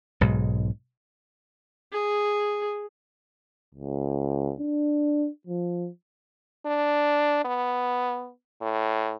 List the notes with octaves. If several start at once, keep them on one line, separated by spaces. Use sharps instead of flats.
B1 G#2 B2 G#3
G#4
C#2
D4
F3
D4
B3
A2